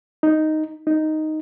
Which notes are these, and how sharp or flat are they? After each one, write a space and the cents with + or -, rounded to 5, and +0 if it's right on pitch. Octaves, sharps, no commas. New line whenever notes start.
D#4 +0
D#4 +0